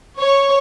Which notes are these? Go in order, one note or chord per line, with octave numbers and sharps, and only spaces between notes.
C#5